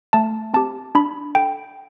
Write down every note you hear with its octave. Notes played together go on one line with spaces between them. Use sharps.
A3 A5
C4 G4 A5
D4 B5
A4 G5